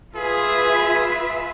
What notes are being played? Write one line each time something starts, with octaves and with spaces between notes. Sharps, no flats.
F4 G#4 B4 E5